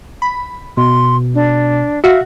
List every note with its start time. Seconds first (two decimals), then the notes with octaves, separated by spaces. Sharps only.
0.22 B5
0.77 B2 C6
1.34 D4
2.04 F#4 E5 F5